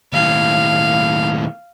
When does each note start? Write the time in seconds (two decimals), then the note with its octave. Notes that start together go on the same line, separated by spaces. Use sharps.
0.13 D#2 A2 F5